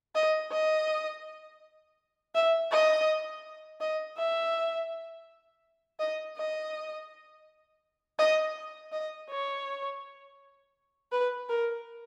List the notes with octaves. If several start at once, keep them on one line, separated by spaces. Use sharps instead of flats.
D#5
D#5
E5
D#5
D#5
E5
D#5
D#5
D#5
D#5
C#5
B4
A#4